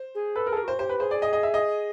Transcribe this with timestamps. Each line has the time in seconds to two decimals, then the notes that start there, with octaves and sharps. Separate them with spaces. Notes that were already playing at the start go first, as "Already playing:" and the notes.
Already playing: C5
0.15 G#4
0.36 A4 B4
0.47 A#4
0.51 G#4 A4
0.57 A#4
0.64 F#4 C5
0.79 G4 C5
0.89 B4
1.00 G#4 C5
1.11 D5
1.22 D#5
1.33 D#5
1.43 E5
1.54 D#5